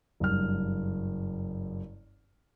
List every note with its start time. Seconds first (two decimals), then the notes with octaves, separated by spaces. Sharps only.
0.20 F#1 G2 F6